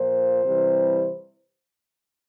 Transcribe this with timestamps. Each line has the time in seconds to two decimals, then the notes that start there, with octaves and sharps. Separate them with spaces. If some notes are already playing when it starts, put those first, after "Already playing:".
Already playing: A#2 F3 C5
0.45 C3 E3 G3